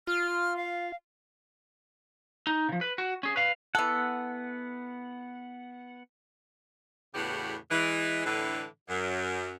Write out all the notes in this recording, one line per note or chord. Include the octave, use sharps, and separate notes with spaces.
F4 F6
F5
D#4
C#3 F3
B4
F#4
C#4 G#4
B4 F5
E3 B3 A4 F#5
E2 A2 C#3 B3 F#4 G4
E3 G#3
A2 D3 E3 D4 A4 B4
F#2